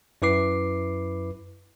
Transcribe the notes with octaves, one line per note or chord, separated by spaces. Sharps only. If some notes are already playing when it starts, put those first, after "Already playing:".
F#2 E4 B4 D6 C7